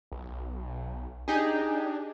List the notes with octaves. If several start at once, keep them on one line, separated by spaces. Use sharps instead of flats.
B1
D4 D#4 G4 G#4